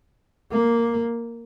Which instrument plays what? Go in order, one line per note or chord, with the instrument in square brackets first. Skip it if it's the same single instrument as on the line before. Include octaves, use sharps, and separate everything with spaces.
[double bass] A#3